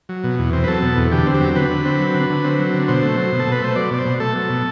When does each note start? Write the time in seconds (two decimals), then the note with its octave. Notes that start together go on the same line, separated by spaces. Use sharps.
0.09 F#3
0.24 B2
0.38 E2
0.53 C4
0.64 B4
0.68 F#3 A4
0.82 B2
0.97 E2
1.12 D3 G4
1.27 C4
1.34 G4
1.41 F#3
1.56 D3 B4
1.71 D3
1.85 C4
2.00 F#3
2.14 D3
2.30 D3
2.44 C4
2.59 F#3
2.74 D3
2.88 B2 C5
3.03 A3
3.17 F#3
3.32 B2
3.40 A4
3.47 B2 B4
3.62 A3 C5
3.76 F#3 D5
3.91 B2 D5
3.99 C5
4.06 B2
4.20 A3 A4
4.35 F#3
4.50 B2